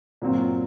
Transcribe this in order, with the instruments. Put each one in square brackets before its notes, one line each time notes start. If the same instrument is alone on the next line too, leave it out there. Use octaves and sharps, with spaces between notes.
[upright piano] A#2 F#3 C4